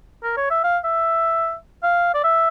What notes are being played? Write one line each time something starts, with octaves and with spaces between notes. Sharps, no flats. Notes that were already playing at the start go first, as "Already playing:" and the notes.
A#4
C#5
E5
F5
E5
F5
D5
E5